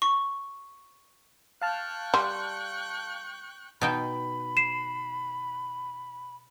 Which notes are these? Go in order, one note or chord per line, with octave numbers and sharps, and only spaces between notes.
C#6
F5 G5 A5 C#6 F6 F#6
G3 C6
B2 D#4 G5 B5
C7 E7